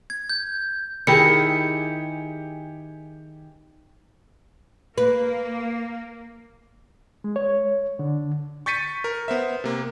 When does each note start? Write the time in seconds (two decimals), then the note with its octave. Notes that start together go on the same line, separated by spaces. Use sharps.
0.10 G#6
0.30 G6
1.07 D#3 E4 G4 G#4 C#7
4.98 A#3 B4
7.24 G#3
7.36 C#5
7.99 D3
8.66 C#6 G6 A6 B6 C#7 D#7
9.04 A#4
9.28 B3 C5 E5
9.64 C3 A#3